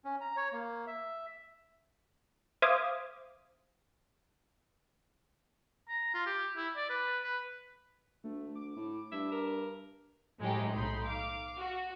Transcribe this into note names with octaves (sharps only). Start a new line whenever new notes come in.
C#4
A#5
C#5
A#3
E5
C5 E5 F5 D6 D#6 G#6
A#5
F4
G4
E4
D5
B4
B4
D2 A3
D6
A2
G2 E5
A#4
A2 F#3 G#3 A3 D#4 G4
B1 A3 D#4 B5 C6
F5 D6
F#4